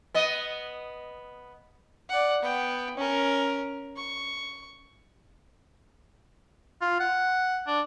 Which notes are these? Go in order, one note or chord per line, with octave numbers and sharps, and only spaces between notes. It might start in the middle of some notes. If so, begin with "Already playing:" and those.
B3 D#5
D5 F#5
B3 G5
C#4 A#4
C#6
F4
F#5
D4